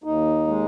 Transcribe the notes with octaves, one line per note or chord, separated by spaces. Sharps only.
D#2 D#4
G#3